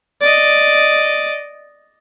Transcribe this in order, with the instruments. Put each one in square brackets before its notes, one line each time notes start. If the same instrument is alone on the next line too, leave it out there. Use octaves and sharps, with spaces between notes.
[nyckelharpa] D5 D#5